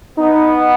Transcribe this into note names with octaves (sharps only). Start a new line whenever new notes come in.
B3 D#4